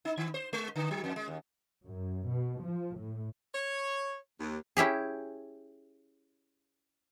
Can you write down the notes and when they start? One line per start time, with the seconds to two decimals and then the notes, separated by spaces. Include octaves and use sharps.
0.05 D#4
0.17 D#3
0.34 C5
0.53 G#3
0.76 D3
0.91 F#3
1.04 F2
1.16 G#3
1.28 D#2
1.86 F#2
2.29 B2
2.64 F3
2.97 A2
3.55 C#5
4.40 D#2
4.77 C#4 E4 G4 G#4